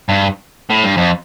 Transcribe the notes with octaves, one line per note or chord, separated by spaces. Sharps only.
G2
A2
G2
F2